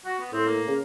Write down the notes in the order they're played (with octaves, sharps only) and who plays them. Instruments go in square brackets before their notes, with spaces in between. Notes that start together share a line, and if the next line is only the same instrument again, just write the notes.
[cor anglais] F#4
B3
[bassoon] A2 [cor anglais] C4
[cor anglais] A#3
[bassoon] C#3